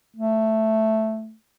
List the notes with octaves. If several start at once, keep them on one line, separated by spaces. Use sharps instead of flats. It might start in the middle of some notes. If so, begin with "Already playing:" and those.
A3